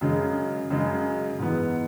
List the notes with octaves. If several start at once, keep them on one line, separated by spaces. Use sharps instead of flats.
F#2 C#3 G#3
F#2 C#3 G#3
G#2 E3 B3